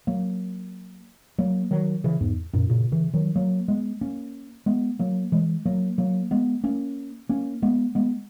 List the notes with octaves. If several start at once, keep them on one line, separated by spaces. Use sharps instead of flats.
F#3 A#3
F#3 A#3
D#3 F#3
C#3 E3
E2 G#2
F#2 A#2
A#2 C#3
C#3 E3
D#3 F#3
F#3 A#3
G#3 B3
A#3 C#4
G#3 B3
F#3 A#3
E3 G#3
F#3 A#3
F#3 A#3
G#3 B3
A#3 C#4
A#3 C#4
G#3 B3
G#3 B3